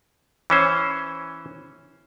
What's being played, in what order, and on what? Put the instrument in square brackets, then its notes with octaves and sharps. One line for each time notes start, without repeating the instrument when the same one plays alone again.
[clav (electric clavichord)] E3 C#4 C5